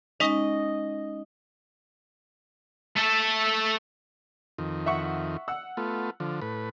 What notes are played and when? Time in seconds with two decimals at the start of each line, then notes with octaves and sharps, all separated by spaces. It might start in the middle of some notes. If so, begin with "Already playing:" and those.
0.20 G#3 C#4 D#4 D#5
2.97 A3 A4
4.58 F2 D#3
4.86 E5 F#5 C#6
5.48 F#5 E6
5.77 A3 B3 F4
6.20 D3 F3
6.42 A2 B4